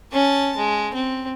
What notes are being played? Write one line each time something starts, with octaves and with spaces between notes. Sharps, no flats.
C#4 A5
G#3
C4